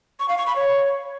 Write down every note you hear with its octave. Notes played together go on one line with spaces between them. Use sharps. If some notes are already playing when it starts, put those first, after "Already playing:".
C#6
F5
C#6
B5
C#5